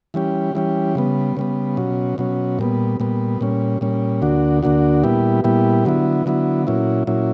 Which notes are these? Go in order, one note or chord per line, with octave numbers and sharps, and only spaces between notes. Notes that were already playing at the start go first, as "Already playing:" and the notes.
E3 G3 C#4 G4
E3 G3 C#4 G4
C#3 G3 B3
C#3 G3 B3
B2 F#3 C#4
B2 F#3 C#4
A#2 G3 B3
A#2 G3 B3
A#2 G3 C#4
A#2 G3 C#4
D2 D3 A#3 D4 F#4
D2 D3 A#3 D4 F#4
A#2 G3 B3 E4 G4
A#2 G3 B3 E4 G4
D3 F#3 B3 E4
D3 F#3 B3 E4
A#2 F#3 C#4 E4
A#2 F#3 C#4 E4